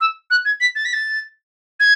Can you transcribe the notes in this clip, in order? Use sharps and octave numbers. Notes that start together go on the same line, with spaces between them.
E6
F#6
G#6
B6
A6
B6
A6
G#6